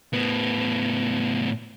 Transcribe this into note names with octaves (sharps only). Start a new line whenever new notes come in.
A2 B3